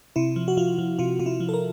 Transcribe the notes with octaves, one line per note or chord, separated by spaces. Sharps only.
C3 E4
F3
F#4
F3 F4
F3
C3 F4
C3 F4
E4
F3
A4
A#4